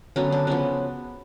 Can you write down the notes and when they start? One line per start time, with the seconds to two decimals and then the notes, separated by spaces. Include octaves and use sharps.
0.16 D3 F#3 B3 C#4
0.32 D4
0.47 C#3 F3 B3 C#4